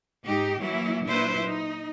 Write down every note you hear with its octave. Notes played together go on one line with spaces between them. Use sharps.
G#2 D#4 G4
E3 F#3 A#3 E4
A#2 F#3 D4 E4 B4 C5
D#4